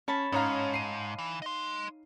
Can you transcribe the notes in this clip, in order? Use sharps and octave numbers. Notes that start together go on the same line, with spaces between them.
C#4 C#5 A5 B5
G#2 C#4 D#4 C#5 F5 A#5
C7 D#7
E3
D#5 C6